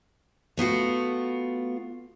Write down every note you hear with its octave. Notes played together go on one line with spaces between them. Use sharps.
A3 B3 F4 F#4